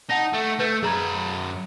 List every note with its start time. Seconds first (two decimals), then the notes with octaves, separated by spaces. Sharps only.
0.10 D#4 F#5 A5 A#6
0.34 A3
0.60 A3 B4 G6
0.83 F#2 G#4 A#5 B5 G#6